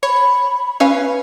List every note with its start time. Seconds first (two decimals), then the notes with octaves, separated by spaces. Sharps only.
0.03 C#5 B5
0.80 C#4 B4 F5 G#5